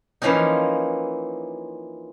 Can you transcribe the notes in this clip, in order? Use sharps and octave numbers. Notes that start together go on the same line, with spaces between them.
E3 F3 A#3 C#4 D#4